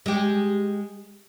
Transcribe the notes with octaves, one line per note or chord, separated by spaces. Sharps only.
G#3 G4